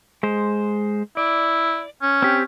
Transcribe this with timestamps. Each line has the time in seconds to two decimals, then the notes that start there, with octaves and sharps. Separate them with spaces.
0.23 G#3 C5
1.17 E4 D5
2.02 C#4
2.22 C4 G4